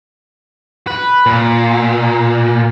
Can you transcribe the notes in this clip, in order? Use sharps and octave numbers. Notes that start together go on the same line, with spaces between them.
B4
A#2